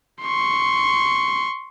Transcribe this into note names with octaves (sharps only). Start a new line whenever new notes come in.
C6 C#6